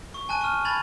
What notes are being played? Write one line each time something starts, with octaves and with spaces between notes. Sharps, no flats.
C#6
G#5 A5 F#6 D#7
C#6 F6
A5 B5 G#6 A6 F7 F#7